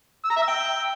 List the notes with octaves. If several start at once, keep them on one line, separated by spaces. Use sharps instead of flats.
E6
A#5
E5
E6
G5